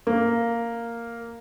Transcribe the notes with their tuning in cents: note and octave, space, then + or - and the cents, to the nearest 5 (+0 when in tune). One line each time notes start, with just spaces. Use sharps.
A#3 -5